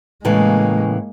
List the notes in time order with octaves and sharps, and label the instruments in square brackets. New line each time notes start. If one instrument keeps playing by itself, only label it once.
[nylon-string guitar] A2 C#3 E3 [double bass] G#3 A#3